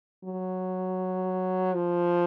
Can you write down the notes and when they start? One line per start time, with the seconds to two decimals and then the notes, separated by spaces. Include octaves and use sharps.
0.24 F#3
1.75 F3